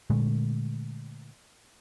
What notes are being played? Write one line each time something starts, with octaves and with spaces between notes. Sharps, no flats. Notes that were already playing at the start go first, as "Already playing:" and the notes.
A#2 D3 G#3 A3